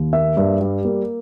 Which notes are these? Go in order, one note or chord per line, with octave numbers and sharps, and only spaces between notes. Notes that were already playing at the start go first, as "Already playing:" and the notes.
Already playing: D#2
A#3 E5
G2
G3
A#3